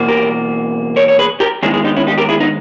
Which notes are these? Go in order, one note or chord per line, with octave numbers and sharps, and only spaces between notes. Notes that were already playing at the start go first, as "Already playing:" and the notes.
Already playing: E2 B2 A#3
G4 A#4
A#4 C#5
C#5
G#4 B4
G4 A#4
D#2 D#3 G#3 B3 E4 G#4
E4 G#4
D#4 G4
C#4 E4
D#4 G4
G4 A#4
E4 G#4
B3 D#4